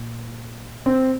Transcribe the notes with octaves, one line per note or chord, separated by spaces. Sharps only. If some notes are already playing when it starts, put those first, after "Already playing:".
Already playing: A#2
C4